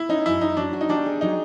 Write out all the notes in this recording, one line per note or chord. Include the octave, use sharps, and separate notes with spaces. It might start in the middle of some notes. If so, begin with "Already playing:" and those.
Already playing: E4
C#4 D#4
F#2 E4
F#2 D#4
F#3 D4
F#4
D#4
G3 D4
G#4
F#3 D#4